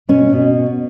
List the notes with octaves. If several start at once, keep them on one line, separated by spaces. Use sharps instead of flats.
B2 C#4
B2